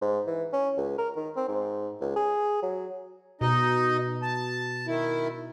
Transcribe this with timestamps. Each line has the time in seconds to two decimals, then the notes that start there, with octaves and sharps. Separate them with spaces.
0.02 G#2
0.27 E3
0.53 C#4
0.77 C#2
0.98 A#4
1.16 D#3
1.36 C4
1.48 G#2
2.01 C#2
2.16 G#4
2.62 F#3
3.41 B2 D#4 D#5
4.22 A5
4.87 D#3 E4